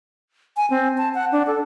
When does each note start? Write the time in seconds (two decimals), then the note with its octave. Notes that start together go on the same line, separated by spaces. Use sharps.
0.57 G#5
0.70 C4
0.98 A5
1.15 F#5
1.32 D4
1.47 A4